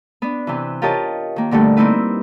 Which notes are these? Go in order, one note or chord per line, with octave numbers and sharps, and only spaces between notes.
B3 D4
C3 E3
F4 G4 A#4 C#5 D#5 A5
D#3 A#3
A#2 D3 G3 A3
A#3 C4 D#4 E4 B4